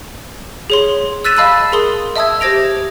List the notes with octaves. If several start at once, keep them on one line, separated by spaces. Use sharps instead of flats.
G#4 C#5 C6
E6 F#6 A6 B6 D#7 E7
D#5 F5 A5 B5 E6 D#7
G#4 A#4 C6 D#6 G7
D#5 E5 A5 D#6 E6 G#6
G4 C5 G#6 A#6 D7 F7